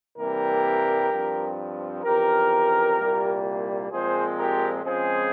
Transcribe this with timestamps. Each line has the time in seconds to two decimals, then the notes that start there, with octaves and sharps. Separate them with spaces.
0.17 C2 C3 E3 G3 A#3 G4 A#4
1.10 G2 F3 C4
2.04 F2 C#3 E3 G4 A#4
2.98 C2 A#2 G3 A#3
3.91 A#2 F3 G#3 C4 G#4 C5
4.38 G4 A#4
4.85 C#2 C#3 F3 G#3 C4 G#4 C5